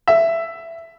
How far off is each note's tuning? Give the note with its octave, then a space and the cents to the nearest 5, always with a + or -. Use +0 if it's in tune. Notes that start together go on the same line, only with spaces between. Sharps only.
E5 +10